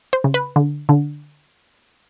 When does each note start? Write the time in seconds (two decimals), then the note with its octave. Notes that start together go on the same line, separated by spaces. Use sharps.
0.13 C5
0.24 C#3
0.34 B4
0.56 D3
0.89 D3